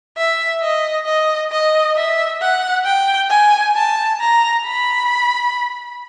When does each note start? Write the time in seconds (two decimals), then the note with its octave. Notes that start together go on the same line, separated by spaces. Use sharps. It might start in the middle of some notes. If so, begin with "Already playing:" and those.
0.17 E5
0.62 D#5
1.07 D#5
1.52 D#5
1.96 E5
2.41 F#5
2.85 G5
3.30 G#5
3.75 A5
4.20 A#5
4.65 B5